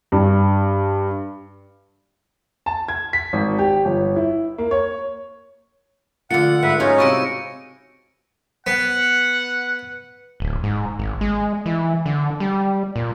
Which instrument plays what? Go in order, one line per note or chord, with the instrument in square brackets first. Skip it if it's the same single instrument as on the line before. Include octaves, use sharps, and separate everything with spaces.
[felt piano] G2
[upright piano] A5
G#6
B6
G#1
G4
G1
E4
A#3
C#5
[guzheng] D3 A3 [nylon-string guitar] F3 F4 [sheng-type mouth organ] F#5 [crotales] C#7
[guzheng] G#2 [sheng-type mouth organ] B4 E5 F#5
[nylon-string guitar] G3 F#4 [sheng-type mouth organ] C#4 D#4 [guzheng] F4 G#4 C#5
[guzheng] C3 E4 A5 [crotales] C#6 A#6 D7
[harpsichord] B3 [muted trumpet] F#5
[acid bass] D1
G#2
G#1
G#3
E3
D3
G3
A#2